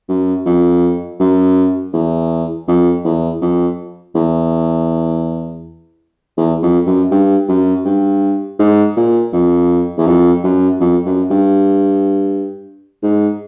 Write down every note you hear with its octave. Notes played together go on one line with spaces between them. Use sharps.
F#2
F2
F#2
E2
F2
E2
F2
E2
E2
F2
F#2
G2
F#2
G2
G#2
A#2
F2
E2
F2
F#2
F2
F#2
G2
G#2